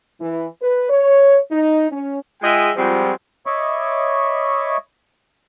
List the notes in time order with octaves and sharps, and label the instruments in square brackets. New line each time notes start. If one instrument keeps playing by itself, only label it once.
[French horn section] E3
B4
C#5
D#4
C#4
[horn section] G#3 F4 G#4 D#5 E5 G5
F3 G3 G#3 C4 F4 F#4
[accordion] C#5 D#5 E5 B5 C#6 D6